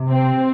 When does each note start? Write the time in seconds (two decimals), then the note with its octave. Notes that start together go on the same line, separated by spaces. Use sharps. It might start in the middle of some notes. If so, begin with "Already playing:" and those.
Already playing: C3
0.09 C4